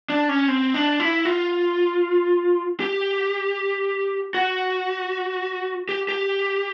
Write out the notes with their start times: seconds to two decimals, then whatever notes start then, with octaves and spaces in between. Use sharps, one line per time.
0.10 D4
0.29 C#4
0.48 C4
0.74 D4
1.00 E4
1.25 F4
2.80 G4
4.34 F#4
5.89 G4
6.09 G4